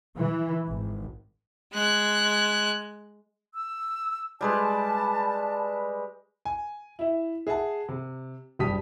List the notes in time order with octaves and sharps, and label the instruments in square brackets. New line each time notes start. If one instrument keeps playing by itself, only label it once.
[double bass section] E3
G#1
[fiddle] G#3 F#6
[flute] E6
[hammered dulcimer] G3 G#3 B4 [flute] A5
[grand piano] G#5
E4 E5
G#4 E5 F#5 G#5 A5
C3
F#1 G2 G4 A5 D#6 B6